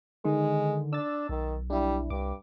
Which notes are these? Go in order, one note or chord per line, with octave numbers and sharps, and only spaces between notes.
D3 D#3 G#3
D4 E6 A6
B1 D#3
G3 D4 E4
C2 G2 D6